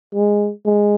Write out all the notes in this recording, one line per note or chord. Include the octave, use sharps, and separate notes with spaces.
G#3
G#3